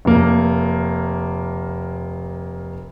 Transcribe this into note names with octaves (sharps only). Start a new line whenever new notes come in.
F1 A#3